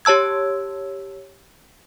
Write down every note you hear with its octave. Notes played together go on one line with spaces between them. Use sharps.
G4 C#5 A5 E6 G#6